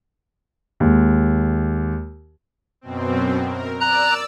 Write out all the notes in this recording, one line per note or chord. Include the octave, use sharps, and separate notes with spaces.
D#2 G#3
F#2 B2 C4
A#4
D5 A#5 E6 F#6